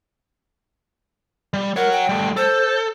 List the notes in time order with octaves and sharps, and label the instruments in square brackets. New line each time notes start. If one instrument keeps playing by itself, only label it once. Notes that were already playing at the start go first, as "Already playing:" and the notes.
[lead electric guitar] G3
[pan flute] A#4 [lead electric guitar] C#5 F#5
[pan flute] G5
[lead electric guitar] G3 A3
[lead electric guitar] A4 [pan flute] C5